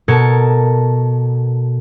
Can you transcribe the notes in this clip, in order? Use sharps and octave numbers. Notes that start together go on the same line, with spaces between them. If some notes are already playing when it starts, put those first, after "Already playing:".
B2 A4 A#4 A5 G#6 C#7